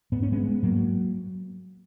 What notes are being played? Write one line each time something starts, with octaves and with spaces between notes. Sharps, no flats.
G#2 B3
C#4
G#3 B3
G#2 F#3 A#3